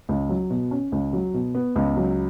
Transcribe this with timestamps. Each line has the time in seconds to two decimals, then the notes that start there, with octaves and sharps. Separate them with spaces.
0.09 C#2
0.29 F#3
0.50 B2
0.71 C#4
0.92 C#2
1.13 F#3
1.34 B2
1.55 B3
1.76 C#2
1.97 F#3